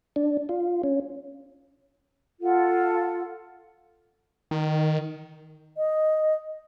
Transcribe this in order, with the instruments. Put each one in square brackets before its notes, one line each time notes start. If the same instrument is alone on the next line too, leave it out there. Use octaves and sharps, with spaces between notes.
[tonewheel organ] D4
F4
C#4
[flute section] F4 A4 F#5
[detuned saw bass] D#3
[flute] D#5